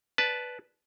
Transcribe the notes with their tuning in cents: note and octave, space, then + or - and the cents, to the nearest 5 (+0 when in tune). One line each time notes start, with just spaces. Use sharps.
B4 +0 D5 +0 A5 -15